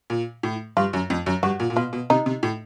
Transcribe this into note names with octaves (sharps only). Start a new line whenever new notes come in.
A#2
A2
G2 F4
F#2
F2
F#2
G2 F#4
A#2
A#2
B2 F4
B2
C3 D#4
C3
A2